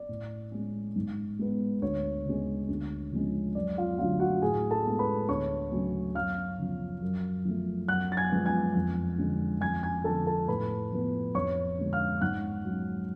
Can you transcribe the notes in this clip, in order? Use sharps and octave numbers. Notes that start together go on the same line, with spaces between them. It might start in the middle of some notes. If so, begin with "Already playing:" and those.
Already playing: D5
A2
G#3 C#4
G#2
G#3 B3
D2 C#5
C#3 G#3
D2
C#3 F3 G#3 C#4
F#2 D5
F4 F5
D3 F#3 A3 F4 F5
F#4 F#5
A2 G#4 G#5
A4 A5
G#3 B3
B4 B5
D2 C#5 C#6
C#3 F#3 A3 C#4
F#2 F5 F6
C#3 F3
F#2
F3 A3
F#2 F#5 F#6
A6
G#5 G#6
F3 G#3 B3
G#5 G#6
F2
D3 G#3 C#4
F2 G#5 G#6
G#5 G#6
D3 F3 A4 A5
A4 A5
A2 B4 B5
F3 B3
F2 C#5 C#6
D3 G#3
F5 F6
G#2 F#5 F#6
F#3 C#4